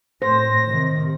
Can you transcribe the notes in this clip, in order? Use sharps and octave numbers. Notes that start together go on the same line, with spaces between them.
A2 C5 A#6
C3 D#3